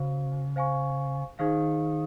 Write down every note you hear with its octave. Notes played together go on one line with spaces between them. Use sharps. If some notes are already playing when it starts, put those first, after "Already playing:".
Already playing: C#3 F#4 C5 F5
C5 F5 G#5 C#6
D#3 D#4 G#4 C5 F5